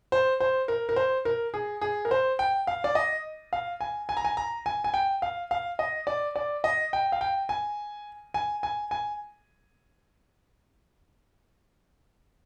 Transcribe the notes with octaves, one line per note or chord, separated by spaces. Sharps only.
C5
C5
A#4
A#4
C5
A#4
G#4
G#4
A#4
C5
G5
F5
D5
D#5
F5
G#5
G#5
A#5
G#5
A#5
G#5
G#5
G5
F5
F5
D#5
D5
D5
D#5
G5
F5
G5
G#5
G#5
G#5
G#5